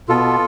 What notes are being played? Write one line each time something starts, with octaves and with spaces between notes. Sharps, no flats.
B2 B3 F4 A4